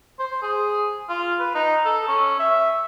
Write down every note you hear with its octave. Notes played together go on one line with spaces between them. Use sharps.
C5
G#4
F4
B4
D#4
A4
C#4
E5